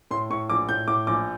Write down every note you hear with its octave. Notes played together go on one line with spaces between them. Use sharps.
A2 C6
A2 C#6
A#1 D6
A2 G6
A2 D6
A#1 D6